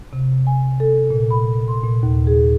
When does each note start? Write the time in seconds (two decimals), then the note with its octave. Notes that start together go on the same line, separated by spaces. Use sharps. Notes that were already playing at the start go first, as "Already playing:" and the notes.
0.13 C3
0.47 G#5
0.80 A4
1.11 A#2
1.30 B5
1.68 C6
1.84 A#2
2.03 D#2
2.27 G#4